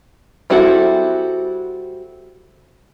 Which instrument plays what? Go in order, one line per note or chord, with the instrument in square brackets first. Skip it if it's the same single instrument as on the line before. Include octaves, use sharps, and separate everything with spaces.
[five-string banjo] G3 C4 E4 F#4 A4